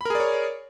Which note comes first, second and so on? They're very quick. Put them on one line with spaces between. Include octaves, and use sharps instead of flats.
B5 A#4 G#4 D5 C#5